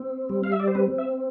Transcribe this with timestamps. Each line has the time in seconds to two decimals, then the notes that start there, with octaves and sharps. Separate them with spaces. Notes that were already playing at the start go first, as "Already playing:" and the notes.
Already playing: C4
0.29 G3
0.44 F5
0.52 E5
0.60 D5
0.68 C5
0.75 C4 B4
0.98 E5